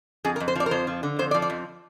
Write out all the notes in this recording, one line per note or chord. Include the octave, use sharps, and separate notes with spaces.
F2 G#4
A#4
F2
C5
F3 D5
A#4
F2 C5
F3
D3
F2 C5
D5
F3
D5
F2